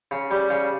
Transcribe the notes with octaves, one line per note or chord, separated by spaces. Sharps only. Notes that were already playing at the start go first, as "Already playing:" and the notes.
C#3
G3
C#3